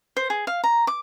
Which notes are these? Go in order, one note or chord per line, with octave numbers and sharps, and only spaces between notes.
C5
G#4
F5
A#5
D6